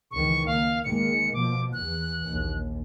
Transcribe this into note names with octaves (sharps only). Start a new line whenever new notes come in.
C#2 D#3 E3 C#6
A#3 F5
D#3 G#3 A#3 C#7
B2 F3 D6
E2 E3 F#6
A#1 D#2